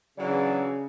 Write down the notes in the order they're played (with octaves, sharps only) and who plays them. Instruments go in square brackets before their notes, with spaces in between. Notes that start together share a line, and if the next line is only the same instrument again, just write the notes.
[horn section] C#3 [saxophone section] E3 D4 [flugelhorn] F#3 [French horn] D5